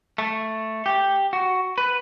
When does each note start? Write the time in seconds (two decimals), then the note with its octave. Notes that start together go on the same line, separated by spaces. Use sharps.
0.18 A3
0.86 G4
1.33 F#4
1.78 B4